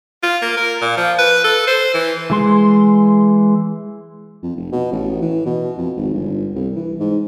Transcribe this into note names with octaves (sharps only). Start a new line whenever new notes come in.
F4
A#3
A#4
A#2
F3
B4
A4
C5
E3
E3 G#3 C6
F2
F1
B2
A1
E3
B2
F2
G#1
G1
C2
E3
G#2